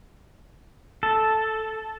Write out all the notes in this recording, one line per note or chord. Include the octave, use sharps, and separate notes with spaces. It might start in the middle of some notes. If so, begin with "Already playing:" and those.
A4